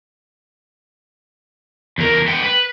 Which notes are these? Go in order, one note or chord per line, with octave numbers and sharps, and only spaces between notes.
E2 A#4
B3 G5
B4